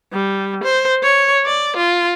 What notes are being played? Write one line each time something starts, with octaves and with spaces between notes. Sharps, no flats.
G3
C5
C#5
D5
F4